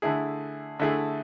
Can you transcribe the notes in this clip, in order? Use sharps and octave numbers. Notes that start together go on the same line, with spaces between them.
D3 A3 E4 G#4
D3 A3 E4 G#4